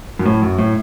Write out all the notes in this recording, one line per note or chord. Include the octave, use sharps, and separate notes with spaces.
F#2
A2
F#2
A2